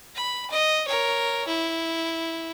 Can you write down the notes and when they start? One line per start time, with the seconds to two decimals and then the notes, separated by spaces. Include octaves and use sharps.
0.15 B5
0.50 D#5
0.87 A#4 C#5
1.47 E4